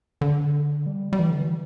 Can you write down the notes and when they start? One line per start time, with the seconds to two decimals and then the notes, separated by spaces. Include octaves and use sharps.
0.21 D3
0.86 G3
1.13 G3
1.19 E3
1.30 D3
1.41 E3